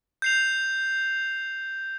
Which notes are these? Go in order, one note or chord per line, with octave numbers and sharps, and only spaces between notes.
G6 C7 F7